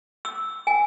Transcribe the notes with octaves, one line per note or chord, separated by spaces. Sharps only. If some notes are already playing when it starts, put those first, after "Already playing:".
E6
G#5